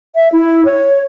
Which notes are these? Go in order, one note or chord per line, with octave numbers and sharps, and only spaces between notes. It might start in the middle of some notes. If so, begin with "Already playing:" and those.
E5
E4
C#5